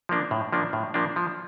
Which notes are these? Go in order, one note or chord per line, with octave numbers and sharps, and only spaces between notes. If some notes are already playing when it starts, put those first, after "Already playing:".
F3 A#3 D4
A2
F3 A#3 D4
A2
F3 A#3 D4
F3